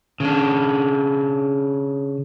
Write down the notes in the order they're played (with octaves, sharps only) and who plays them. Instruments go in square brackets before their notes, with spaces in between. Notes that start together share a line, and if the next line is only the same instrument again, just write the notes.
[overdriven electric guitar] C#3 D4